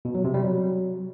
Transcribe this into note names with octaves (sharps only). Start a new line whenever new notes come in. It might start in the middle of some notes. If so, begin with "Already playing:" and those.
B2
F#3
C3
G3
F#3